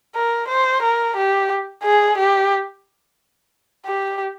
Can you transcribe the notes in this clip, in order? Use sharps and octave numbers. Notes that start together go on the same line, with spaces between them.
A#4
C5
A#4
G4
G#4
G4
G4